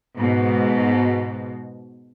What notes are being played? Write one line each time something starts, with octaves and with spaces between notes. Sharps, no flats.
G#2 B2